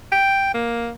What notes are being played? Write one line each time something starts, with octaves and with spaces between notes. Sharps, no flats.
G5
A#3